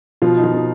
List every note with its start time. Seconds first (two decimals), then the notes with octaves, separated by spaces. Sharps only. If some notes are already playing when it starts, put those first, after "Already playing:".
0.22 B2 F3 F4
0.37 D#4
0.43 F3 F4
0.54 B2